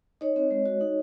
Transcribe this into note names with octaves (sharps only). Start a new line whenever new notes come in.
D#4 C#5 D#5
C4
G#3
F#4
D#4